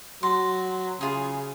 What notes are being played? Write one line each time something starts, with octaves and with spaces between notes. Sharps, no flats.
F#3 C6
C#3 F4 G#4